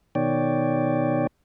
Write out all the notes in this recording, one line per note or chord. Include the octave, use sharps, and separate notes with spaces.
B2 D#3 C#5 D5 G5